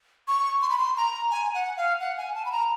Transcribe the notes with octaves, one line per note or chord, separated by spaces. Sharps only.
C#6
C6
B5
C6
A#5
G#5
F#5
F5
F#5
G#5
A5
B5
A#5